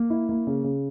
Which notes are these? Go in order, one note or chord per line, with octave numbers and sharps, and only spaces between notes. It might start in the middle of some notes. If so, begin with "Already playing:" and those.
Already playing: A#3
E4
A#3
C#3
C#3